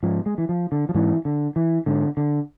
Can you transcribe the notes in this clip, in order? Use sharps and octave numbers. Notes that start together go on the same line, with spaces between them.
G#2 F3
G#3
E3
F3
D3
F3
G#2 E3
D3
E3
G#2 D3
D3